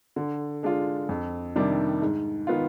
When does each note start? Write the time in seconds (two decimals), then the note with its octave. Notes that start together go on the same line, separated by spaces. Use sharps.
0.16 D3
0.63 G#3 D4 F4
1.09 F2
1.56 C3 D#3 G3 D4
2.02 G#2
2.47 D#3 B3 F4